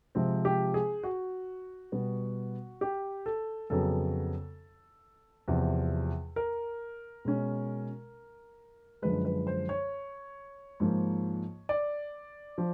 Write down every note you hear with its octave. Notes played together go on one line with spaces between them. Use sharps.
C3 F3 G#3 C4
G4
G#4
F#4
B2 G3 B3
G4
A4
F2 C#3 F#3 B3 A4
E2 C3 F3
A#4
B2 G#3 C#4
F#2 D3 F3 G#3 B4
B4
C5
C#5
G#2 F3 A#3
D5
F3